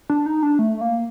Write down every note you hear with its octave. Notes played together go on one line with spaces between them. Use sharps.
D4
D#4
D4
A3
A#3